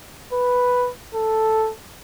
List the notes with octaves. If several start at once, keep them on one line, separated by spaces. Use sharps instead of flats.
B4
A4